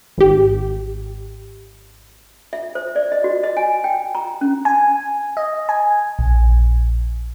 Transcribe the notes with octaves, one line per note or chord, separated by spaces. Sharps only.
G#1 G4
E5
C5
D5
D#5
F#4
D#5
G#5
G5
A#5
C#4
G#5
D#5
G#5
A#1